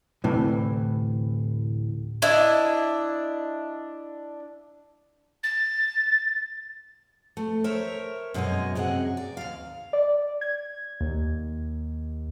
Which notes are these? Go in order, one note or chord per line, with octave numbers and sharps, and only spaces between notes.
D2 A2 C3 E3
D4 E4 D#5
A6
A3
A#4 C5 C#5 E5
F#2 B2 G#3 G#4 C#5 D#5
F#2 C3 G#4 D#5 F#5
D5
D#2 F5
D5
G#6
D#2